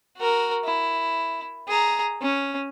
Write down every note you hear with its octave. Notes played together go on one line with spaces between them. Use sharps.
F#4 A#4
E4
G#4 A#5
C#4